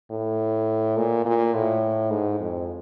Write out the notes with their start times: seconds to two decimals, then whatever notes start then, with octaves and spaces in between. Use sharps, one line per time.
0.10 A2
0.97 A#2
1.25 A#2
1.54 A2
2.10 G#2
2.39 F2